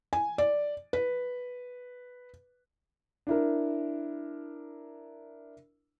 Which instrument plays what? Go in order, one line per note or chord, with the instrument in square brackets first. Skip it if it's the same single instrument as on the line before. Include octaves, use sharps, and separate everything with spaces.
[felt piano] G#5
D5
B4
[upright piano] D4 E4 A#4